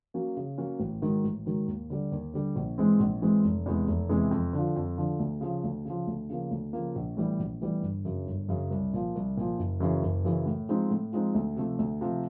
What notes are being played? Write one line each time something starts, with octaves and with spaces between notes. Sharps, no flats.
F#3 A#3 C#4 F#4
C#3
F#3 A#3 C#4 F#4
A1
G#2 D#3 F#3
A1
G#2 D#3 F#3
D#2
D3 G3
D#2
D3 G3
A#1
G#2 E3 G#3 C4
A#1
G#2 E3 G#3 C4
F1
E2 C3 E3 G#3
F1
E2 C3 E3 G#3
F2
D3 F3
F2
D3 F3
D2
C#3 F3
D2
C#3 F3
D2
C#3 F3 A#3
D2
C#3 F3 A#3
A#1
A2 E3 G3 B3
A#1
A2 E3 G3 B3
G1
F#2 C#3
G1
F#2 C#3
C2
A#2 F3
C2
A#2 F3
F#1
F#2 C#3 E3
F#1
F#2 C#3 E3
A2
F3 G#3 C4 D#4
A2
F3 G#3 C4 D#4
D2
C3 F3 A3
D2
C3 F3 A3